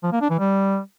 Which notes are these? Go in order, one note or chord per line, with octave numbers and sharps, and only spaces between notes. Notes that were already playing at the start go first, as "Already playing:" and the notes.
F3
A#3
D4
E3
G3